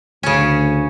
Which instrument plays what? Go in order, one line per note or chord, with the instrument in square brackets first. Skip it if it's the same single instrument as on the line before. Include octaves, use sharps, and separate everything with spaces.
[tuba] D2 [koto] C#3 C#4